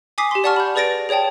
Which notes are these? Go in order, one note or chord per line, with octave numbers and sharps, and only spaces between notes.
G#5 D6 D#6 B6 C7
G4 C6
D5 F#5 A5 C#6 F6
B5 G6
G#4 B4 D5 A6 A#6 D7
G#4 C#5 D5 G5 A5